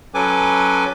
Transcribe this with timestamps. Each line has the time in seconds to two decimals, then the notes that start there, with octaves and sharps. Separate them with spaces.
0.14 F#3 C#4 A4 B4 G#5 D6